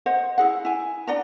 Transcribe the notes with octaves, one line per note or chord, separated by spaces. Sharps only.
C5 D#5 F#5
E4 G#4 F#5
E4 G#5
D4 D5 F#5 A#5